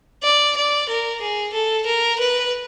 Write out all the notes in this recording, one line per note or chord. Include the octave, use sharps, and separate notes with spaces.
D5
D5
A#4
G#4
A4
A#4
B4